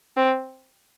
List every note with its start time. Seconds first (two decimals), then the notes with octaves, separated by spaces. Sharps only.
0.17 C4